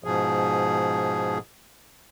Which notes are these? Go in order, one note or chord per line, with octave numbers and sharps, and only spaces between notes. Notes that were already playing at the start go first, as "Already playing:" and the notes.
G#2 B2 F3 G#4